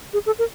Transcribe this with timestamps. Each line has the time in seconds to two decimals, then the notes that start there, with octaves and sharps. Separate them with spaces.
0.13 G#4
0.26 A4
0.39 A#4